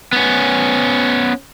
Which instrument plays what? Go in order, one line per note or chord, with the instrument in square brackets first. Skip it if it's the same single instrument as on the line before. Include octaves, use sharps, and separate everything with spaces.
[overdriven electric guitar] B3 C#4